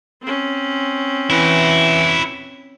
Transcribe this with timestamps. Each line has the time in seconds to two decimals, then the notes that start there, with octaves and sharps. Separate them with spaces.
0.22 C4 C#4
1.30 E3 E4 F#4